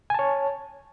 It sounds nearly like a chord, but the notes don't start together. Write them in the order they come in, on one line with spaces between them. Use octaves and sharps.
G#5 A5 C#5